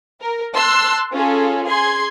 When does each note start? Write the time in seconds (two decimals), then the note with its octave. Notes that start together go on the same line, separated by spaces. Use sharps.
0.20 A#4
0.54 A5 C6 E6 F#6
1.12 C#4 F4 G#4 A4
1.65 G#4 C6 G#6